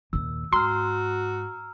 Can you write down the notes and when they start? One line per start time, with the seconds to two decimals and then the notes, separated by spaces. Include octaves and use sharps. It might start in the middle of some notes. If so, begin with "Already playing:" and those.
0.13 D#2 A#2 E6
0.53 G#2 F#4 A#5 C6 E6 F6